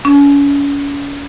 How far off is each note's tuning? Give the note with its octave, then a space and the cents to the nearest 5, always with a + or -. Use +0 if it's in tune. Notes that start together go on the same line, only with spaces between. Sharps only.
C#4 +35